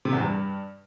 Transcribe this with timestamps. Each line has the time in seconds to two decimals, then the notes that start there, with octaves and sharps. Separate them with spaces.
0.05 C3
0.13 E2
0.20 G2